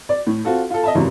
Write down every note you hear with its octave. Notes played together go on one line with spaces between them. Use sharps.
D5
A2
C4 F4 F#4 A4
F4 A4
D#5 E5 A5
G#1 F#2 C3 E3 F#3